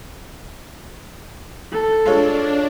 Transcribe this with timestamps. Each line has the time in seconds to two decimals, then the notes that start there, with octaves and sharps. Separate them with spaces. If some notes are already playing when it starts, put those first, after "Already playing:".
1.72 A4
2.06 G#3 D4 F4 C#5